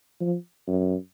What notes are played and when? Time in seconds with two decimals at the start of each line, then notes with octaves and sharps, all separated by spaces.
0.21 F3
0.67 F#2